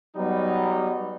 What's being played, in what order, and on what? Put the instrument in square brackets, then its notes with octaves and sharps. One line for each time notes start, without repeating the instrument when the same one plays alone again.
[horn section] F#3 G3 B3 D#4